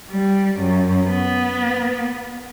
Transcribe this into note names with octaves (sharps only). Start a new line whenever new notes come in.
G3
F#2
B3